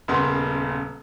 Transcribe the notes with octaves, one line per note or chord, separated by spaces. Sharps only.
D#1 A#2 C#3 B3 C6